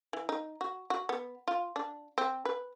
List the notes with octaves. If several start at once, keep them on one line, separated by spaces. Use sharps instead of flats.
E3
D#4
F#4
F#4
B3
F4
D4
C4
B4